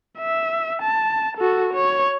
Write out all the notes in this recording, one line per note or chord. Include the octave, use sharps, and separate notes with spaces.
E5
A5
F#4 A4
C#5